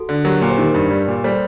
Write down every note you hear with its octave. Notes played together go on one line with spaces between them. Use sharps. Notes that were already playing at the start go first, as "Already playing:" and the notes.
Already playing: F#4 A4
D3
F#3 G4 A#4
A#2
C5
D#3 G4 A#4
G2
G3
A#2
G3 A4 C5